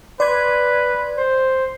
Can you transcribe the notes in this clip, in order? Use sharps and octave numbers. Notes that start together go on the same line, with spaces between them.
B4 D5 C6 G#6
C5